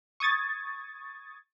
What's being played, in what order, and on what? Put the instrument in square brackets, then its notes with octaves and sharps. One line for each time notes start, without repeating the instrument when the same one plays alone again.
[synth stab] C#6 D#6 G#6 A6